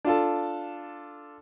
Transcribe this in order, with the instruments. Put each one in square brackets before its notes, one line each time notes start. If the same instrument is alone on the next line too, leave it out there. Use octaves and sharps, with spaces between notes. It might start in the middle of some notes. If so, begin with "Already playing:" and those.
[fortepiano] D4 F4 A4